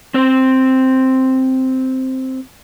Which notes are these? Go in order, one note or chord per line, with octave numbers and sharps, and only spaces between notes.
C4 C5